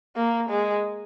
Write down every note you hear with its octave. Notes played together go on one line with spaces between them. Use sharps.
A#3
G#3